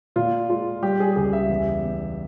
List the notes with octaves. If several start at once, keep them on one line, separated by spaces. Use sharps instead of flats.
A#2 F4
G#3 F4
G3 G4
G#4
C#2 G#4
E5
E2
E2